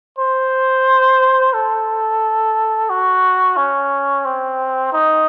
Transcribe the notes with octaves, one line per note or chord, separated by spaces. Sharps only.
C5
A4
F#4
C#4
C4
D#4